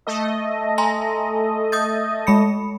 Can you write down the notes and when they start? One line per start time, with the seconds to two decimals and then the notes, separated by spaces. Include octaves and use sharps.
0.07 A3 A4 D#5
0.78 G#5 A#5 C6
1.72 D#6 G6 A6
2.27 G#3 B5 C#7